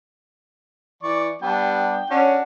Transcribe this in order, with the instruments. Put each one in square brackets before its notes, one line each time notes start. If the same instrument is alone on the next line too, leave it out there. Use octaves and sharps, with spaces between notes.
[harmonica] E3 D5 C#6
[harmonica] G3 B3 D4 [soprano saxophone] G5
[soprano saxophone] C#4 [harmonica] D4 F#4